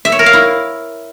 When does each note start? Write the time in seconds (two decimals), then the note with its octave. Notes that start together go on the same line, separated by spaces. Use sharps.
0.05 E5
0.12 C#5
0.19 A#4
0.26 F5
0.33 E4